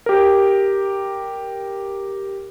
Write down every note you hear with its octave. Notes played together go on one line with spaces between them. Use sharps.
G4 A#4